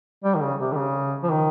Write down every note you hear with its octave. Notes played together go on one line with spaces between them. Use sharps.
G3
D#3
C#3
C3
D#3
C#3
F3
D#3